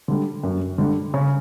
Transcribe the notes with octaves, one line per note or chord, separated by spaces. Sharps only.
D3 G3
F#2
D3 G3
C#3